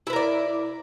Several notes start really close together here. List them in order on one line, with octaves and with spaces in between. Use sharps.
E4 B4 A#4 D5